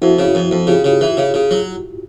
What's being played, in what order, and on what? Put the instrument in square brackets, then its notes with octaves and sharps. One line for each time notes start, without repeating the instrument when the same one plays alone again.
[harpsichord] F2 [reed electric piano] E4 F#4
[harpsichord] C#3
F2
F2
[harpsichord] C#3 [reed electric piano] F4 G4
[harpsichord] C#3
E3
C#3
C#3
F#3